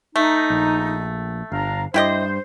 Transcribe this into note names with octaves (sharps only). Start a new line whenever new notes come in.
A3 D#4
A#1
G1 D4 F5 A#5
G2 E4 G4 C5 D#5